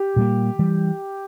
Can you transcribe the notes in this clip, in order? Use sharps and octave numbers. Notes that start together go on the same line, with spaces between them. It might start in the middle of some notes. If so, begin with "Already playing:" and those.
Already playing: G4
A#2 G3 A#3
E3 G3